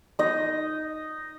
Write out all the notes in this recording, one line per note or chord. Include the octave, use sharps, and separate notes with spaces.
D#4 D#5